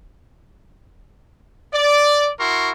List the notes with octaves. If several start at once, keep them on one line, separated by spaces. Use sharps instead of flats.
D5
E4 F#4 A#4 C6 C#6